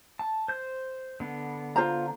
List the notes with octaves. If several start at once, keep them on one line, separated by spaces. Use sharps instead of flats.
A5
C5 G6
D3 B3
F4 C5 A#5